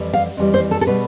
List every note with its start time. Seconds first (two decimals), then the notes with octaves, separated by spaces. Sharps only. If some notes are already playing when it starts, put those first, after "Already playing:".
Already playing: F2 E3 G3
0.13 F5
0.37 F2 E3 G3
0.54 C5
0.71 A4
0.81 A4
0.87 B2 G3 B4